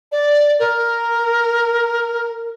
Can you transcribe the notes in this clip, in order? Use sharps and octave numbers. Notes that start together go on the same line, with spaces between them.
D5
A#4